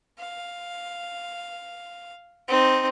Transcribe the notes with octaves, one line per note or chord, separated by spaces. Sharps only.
F5
C4 D#4